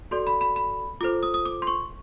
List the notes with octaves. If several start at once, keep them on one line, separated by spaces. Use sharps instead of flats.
F#4 A4 D5 C6
B5
B5
B5
F4 A4 C5 D6
D#6
D#6
D6
C6
C#6